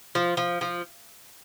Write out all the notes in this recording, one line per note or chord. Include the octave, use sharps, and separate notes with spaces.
F3
F3
F3